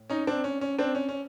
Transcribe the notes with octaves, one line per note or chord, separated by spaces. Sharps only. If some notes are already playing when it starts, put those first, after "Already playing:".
Already playing: A2
C#4 D#4
C4 D4
C#4
C#4
C4 D4
C#4
C#4